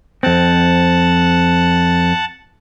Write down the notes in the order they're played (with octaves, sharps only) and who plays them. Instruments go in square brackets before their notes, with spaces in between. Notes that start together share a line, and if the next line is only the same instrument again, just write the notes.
[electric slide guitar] F2 C4 [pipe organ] F#5 A5